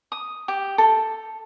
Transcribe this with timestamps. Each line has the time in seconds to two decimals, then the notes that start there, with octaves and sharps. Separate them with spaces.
0.12 D#6
0.48 G4
0.78 A4